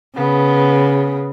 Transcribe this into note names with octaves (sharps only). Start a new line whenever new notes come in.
C#3 B3